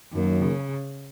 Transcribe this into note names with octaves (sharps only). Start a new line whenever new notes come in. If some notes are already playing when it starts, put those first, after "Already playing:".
F#2 D#3 F#3 A#3
C#3